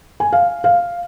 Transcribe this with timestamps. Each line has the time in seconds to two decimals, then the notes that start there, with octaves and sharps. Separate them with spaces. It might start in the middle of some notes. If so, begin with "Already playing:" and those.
0.20 G#5
0.33 F5
0.64 F5